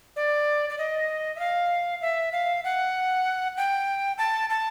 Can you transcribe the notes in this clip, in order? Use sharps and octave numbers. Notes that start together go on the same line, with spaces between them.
D5
D5
D#5
E5
F5
E5
F5
F#5
G5
A5
A5